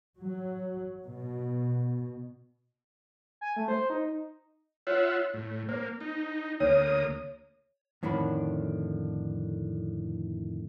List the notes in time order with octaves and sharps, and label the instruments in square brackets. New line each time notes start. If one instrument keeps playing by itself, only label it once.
[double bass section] F#3
B2
[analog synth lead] G#5
A3
C5
D#4
[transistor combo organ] F4 E5 F#5 [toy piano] C#5
[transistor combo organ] A2
[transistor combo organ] A#3 [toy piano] C5
[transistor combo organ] D#4
[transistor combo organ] D2 A#3 D#6 [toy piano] C#5
[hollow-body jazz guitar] F2 A2 D3 D#3 D4 B5